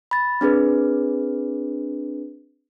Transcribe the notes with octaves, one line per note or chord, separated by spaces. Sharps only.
B5 A6
C4 D4 G#4 B4